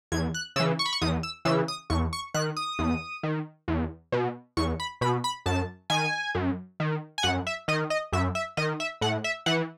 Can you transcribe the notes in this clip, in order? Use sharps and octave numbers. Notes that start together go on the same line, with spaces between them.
E2 G#6
F#6
C#3 E3 E6
C#6
B5
C#6
E2 D#6
E6
C#3 E3 E6
D#6
E2 C#6
C#6
D#3 F#6
D#6
E2
D#3
E2
B2
E2 C#6
B5
B2 B5
B5
F#2 A5
D#3 G#5
F#2
D#3
G#5
F#2 F#5
E5
D#3 D#5
D#5
F#2 E5
E5
D#3 D#5
E5
A2 F#5
E5
E3 F#5